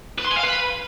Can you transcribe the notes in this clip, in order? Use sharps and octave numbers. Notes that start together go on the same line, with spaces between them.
B4
C6
G#5
F5
B4